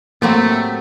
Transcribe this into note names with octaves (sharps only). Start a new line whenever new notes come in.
A2 F#3 A3 A#3 C4 G4